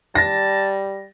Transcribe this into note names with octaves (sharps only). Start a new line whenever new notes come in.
G3 A5 A6 A#6